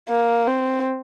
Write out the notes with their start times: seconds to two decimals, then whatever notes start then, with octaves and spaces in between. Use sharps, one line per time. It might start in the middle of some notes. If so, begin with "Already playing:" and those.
0.09 A#3
0.47 C4